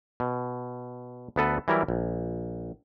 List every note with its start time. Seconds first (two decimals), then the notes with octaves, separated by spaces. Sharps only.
0.20 B2
1.36 D2 B3 A4 B4
1.68 E3 F#3 G3 E4 A#4
1.88 A#1